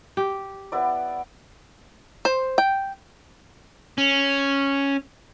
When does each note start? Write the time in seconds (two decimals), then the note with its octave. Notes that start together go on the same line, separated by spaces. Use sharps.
0.17 G4
0.72 B3 E4 D5
2.25 C5
2.58 G5
3.98 C#4